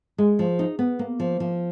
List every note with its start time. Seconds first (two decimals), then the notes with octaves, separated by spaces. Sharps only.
0.18 G#3
0.39 F3
0.59 D#4
0.79 B3
0.99 A#3
1.20 F3
1.40 F3